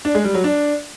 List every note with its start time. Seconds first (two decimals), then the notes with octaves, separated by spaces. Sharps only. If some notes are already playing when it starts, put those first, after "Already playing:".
0.05 D4
0.15 G#3
0.24 G3
0.34 F#3
0.44 D4